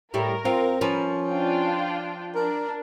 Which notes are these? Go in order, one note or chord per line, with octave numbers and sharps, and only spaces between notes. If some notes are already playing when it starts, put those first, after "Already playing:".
A2 G3 E4 A#4
C4 F4
F3 C#4 B4
D4 F4 G5
D4 A#4